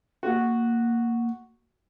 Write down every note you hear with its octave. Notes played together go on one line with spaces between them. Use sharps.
A#3 F#4